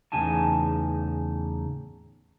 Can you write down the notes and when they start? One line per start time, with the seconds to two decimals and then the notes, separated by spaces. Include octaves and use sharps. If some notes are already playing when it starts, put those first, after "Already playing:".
0.12 E2 A2 C#3 D#4 G#5 A5